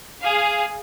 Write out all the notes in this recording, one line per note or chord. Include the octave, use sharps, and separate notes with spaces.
G#4 F5